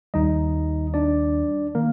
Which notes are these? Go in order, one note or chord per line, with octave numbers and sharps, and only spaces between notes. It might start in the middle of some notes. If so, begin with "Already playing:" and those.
D#2 D#3 G3 D#4 D#5
D4 D5
D#3 A#3 A#4